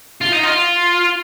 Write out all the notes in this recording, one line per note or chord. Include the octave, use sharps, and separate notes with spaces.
F4
D#4
F4